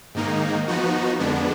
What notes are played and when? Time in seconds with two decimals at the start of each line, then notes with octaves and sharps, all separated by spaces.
0.15 G#2 D#3 A#3 D#4
0.68 F3 B3 D#4 F#4
1.19 F2 D3 G#3 B3 D4